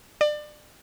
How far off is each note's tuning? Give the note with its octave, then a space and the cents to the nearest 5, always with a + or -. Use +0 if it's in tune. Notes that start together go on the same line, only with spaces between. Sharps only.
D5 +30